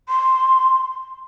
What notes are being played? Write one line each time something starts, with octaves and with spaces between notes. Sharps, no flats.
C6